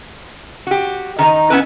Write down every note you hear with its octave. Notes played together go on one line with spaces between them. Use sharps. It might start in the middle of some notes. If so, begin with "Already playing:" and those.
F#4 G4
D#3 D#4 B4 A#5
B3 C#4 E4 B4